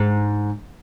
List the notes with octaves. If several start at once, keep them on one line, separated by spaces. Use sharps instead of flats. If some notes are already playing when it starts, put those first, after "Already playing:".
Already playing: G#2